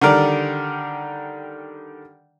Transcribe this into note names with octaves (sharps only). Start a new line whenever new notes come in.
D3 D#3 G3 A#4 D5